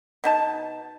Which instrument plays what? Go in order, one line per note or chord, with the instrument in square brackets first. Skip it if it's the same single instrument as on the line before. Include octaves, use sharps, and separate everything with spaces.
[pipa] B2 D#4 A5